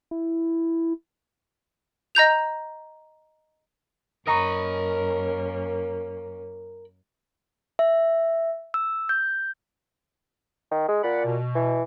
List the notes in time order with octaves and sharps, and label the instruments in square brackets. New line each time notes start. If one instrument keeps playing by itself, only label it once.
[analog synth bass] E4
[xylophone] D#5 A#5 G6 F7
[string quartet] F#2 A#3 C#4 [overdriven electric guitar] A#4 B5 [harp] D#5 A#5 C#6
[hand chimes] E5
E6
G6
[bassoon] D#3
G#3
[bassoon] A#2 [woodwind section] D5 F#5 B5
[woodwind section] B2
[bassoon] E3